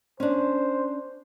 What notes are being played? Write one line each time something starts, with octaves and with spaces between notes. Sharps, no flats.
C#4 D4 C5